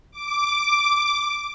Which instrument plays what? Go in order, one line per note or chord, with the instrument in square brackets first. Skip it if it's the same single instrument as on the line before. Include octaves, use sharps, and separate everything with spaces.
[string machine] D6